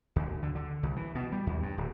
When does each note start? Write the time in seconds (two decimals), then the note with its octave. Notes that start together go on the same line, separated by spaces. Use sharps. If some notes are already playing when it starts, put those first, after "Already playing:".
0.16 D2
0.43 D3
0.55 D3
0.83 C2
0.96 E3
1.15 B2
1.32 G3
1.47 D#2
1.63 G2
1.78 D1